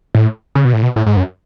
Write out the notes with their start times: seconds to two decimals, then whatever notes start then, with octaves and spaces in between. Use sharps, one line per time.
0.15 A2
0.55 C#3
0.65 B2
0.73 A2
0.83 B2
0.96 A2
1.06 G#2
1.17 F#2